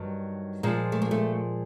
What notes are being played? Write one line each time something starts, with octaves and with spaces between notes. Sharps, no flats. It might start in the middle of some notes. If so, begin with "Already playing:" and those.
Already playing: G2 D#3 F#3
A#2 F3 G#3
A3
A#3
A3